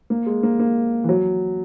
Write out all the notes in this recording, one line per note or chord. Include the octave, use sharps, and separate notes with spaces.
A#3
G#3
A#3
A#3
E3
F#3